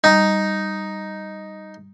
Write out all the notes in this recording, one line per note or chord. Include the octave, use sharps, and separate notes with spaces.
G3 D#4 D#5